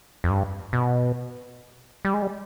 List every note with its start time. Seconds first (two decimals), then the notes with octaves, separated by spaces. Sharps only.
0.24 F2
0.30 G2
0.73 B2
2.05 G3
2.14 G#3
2.22 G3